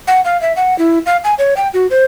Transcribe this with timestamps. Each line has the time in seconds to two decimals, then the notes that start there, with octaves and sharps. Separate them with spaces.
0.07 F#5
0.25 F5
0.41 E5
0.56 F#5
0.79 E4
1.06 F5
1.24 G#5
1.39 C#5
1.57 G5
1.74 F#4
1.91 C5